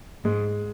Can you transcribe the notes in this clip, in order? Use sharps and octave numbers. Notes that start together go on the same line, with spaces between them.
G#2 G#3